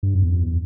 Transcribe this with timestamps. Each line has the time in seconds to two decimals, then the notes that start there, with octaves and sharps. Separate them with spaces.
0.03 G2
0.15 F#2
0.22 E2
0.28 F2
0.40 E2